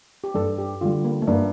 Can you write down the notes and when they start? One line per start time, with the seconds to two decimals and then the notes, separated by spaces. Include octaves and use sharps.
0.24 G4
0.34 G2 A4
0.58 G4
0.81 D3 G3 F4
1.04 A#3
1.22 A3
1.27 G2 A#3